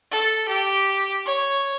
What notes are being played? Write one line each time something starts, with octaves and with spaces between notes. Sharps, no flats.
A4
G4
C#5